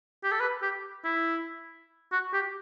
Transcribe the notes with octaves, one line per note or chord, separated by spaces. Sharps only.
G4
A4
B4
G4
E4
F#4
G4